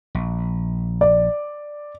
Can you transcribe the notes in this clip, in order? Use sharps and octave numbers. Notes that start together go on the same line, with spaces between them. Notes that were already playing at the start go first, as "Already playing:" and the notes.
A#1
D5